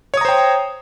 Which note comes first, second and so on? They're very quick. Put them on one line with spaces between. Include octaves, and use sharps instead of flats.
C#5 D#6 A#5 C5 G5